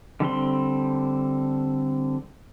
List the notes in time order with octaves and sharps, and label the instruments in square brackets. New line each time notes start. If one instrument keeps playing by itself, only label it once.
[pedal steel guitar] D3 G3 C4 C6